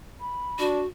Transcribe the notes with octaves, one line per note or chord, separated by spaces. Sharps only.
B5
D4 F#4